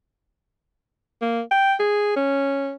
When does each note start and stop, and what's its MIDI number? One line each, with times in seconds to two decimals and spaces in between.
1.22 1.41 58
1.51 1.74 79
1.79 2.12 68
2.16 2.74 61